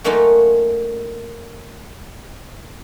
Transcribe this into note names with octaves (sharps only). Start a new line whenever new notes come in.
F#3 A3 A#3 C#4 D#4 F4